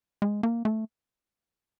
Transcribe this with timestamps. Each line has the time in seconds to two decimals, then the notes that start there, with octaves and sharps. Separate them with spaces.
0.22 G#3
0.43 A#3
0.65 A3